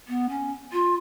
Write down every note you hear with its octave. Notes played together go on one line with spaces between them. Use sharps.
B3
C#4
F4